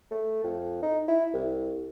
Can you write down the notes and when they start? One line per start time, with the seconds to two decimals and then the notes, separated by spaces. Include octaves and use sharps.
0.11 A3
0.44 F2
0.83 D#4
1.08 E4
1.34 C2